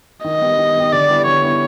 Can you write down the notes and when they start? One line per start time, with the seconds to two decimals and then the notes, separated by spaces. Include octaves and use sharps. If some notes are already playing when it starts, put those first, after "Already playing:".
0.24 D#3 D#5
0.42 G3 B3 D#4 G4
0.58 D#3
0.76 G3 B3 D#4 G4
0.93 D3 D5
1.08 G3 B3 E4
1.25 D3 C#5
1.43 G3 B3 E4